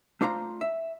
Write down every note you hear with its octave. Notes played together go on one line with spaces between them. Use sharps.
A3 D4 F4 C5 A#5
E5